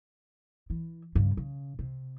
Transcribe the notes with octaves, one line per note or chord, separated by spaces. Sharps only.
E3
G2 C#3
C#3
C3